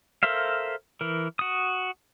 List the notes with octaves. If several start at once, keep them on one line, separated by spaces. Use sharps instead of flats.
A4 A#4 C5 E5 F5
E3 A#4
F#4 D#6